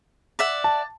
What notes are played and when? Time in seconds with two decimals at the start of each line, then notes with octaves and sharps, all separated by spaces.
0.39 D5 E5 F#5
0.64 A5